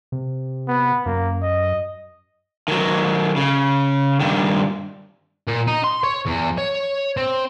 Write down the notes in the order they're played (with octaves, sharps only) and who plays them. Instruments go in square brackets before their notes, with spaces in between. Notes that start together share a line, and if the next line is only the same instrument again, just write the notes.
[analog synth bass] C3
[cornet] B3
[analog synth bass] F#2 [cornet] A#3
[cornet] D#5
[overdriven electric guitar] D#3 F#3
C#3
G2 D#3
[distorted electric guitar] A#2
D#4
C6
C#5
E2
C#5
C4